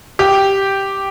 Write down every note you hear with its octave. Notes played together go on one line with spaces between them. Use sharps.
G4